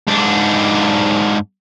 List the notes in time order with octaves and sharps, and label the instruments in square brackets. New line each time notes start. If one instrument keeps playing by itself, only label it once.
[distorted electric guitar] G#2 D4